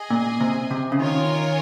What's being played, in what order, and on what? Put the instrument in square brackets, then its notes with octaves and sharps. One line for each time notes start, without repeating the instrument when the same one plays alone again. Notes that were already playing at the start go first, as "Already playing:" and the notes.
Already playing: [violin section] G#4 D#5 G#5
[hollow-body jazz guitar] A#2
C3
C3
C#3
[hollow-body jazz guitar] D#3 [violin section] F4 A#4 C#5 G#5